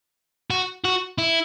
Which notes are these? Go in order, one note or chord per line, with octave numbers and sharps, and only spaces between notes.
F#4
F#4
E4